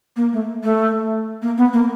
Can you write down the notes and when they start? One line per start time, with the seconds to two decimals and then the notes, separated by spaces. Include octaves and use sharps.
0.16 A#3
0.33 A3
0.63 A3
1.42 A#3
1.57 B3
1.73 A#3